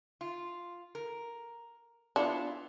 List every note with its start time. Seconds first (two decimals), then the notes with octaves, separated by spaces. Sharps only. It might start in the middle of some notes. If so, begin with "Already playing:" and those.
0.21 F4
0.95 A#4
2.16 B3 D4 E4 F4